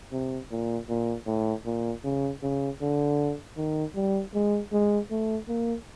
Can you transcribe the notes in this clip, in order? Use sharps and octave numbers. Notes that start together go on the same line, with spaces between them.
C3
A#2
A#2
A2
A#2
C#3
C#3
D3
D#3
G3
G#3
G#3
A3
A#3